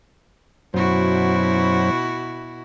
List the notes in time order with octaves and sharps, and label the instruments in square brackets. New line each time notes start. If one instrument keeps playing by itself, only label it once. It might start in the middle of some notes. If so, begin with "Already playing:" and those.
[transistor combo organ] F#2 F#3 C5 [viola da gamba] B2 E4 F#4